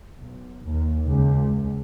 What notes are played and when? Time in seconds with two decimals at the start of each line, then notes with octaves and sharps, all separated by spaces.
0.19 B1
0.66 D#2
1.08 C#2